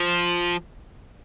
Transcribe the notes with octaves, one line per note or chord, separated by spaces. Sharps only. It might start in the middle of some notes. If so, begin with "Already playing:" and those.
Already playing: F3